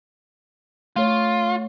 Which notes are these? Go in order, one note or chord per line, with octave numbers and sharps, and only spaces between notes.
A3 F4 A4 C#5